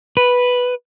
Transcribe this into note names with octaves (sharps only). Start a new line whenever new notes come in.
B4